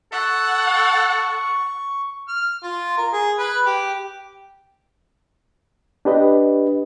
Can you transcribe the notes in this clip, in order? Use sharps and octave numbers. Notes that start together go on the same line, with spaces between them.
A4 F#5 C#6
F6
F4
A#4
G#4
B4
G4
D4 G4 B4 D#5